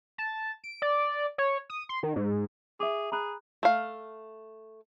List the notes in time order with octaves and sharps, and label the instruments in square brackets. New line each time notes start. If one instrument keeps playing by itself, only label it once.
[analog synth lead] A5
D7
D5
C#5
D#6
C6
D#3
G#2
[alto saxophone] G#4 [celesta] E5 D6
[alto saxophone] G#4 [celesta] A#5 B5 F#6
[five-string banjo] A3 F5